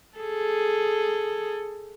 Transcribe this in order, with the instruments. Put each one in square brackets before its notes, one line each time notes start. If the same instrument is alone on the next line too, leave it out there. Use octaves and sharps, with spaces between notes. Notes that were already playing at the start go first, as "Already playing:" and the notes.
[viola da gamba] G#4 A4